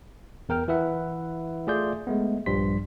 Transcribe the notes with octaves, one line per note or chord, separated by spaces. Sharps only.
E2 A#4 G5 F6
E3 E4 B4 E5 F#5
A3 F4 G#4 D5 C6 G6
G#3 A3 B3
A#1 G2 F3 G3 C6 B6